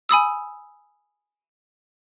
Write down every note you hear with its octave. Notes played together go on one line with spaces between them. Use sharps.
G#5 B5 D#6 E6